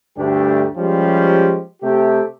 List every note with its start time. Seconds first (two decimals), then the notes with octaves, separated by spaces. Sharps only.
0.17 D2 G2 A3 D4 G4
0.76 F3 G3 G#3 C#4 G4
1.82 C3 A3 G4